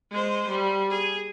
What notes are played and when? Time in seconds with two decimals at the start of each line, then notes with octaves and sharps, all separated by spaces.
0.11 G#3 C5
0.48 G3
0.90 G#4